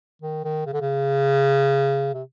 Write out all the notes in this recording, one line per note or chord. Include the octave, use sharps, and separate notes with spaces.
D#3
D#3
C#3
D3
C#3
C3